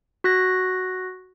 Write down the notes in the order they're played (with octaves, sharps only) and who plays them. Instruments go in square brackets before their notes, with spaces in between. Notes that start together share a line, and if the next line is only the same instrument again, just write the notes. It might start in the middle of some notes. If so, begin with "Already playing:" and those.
[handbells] F#4 F#6 A#6